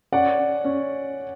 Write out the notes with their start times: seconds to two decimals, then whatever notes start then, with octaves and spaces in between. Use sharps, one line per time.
0.12 C#4 D5 F#5
0.39 C#4
0.65 C#4